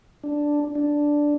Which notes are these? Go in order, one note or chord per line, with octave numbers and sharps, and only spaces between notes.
D4
D4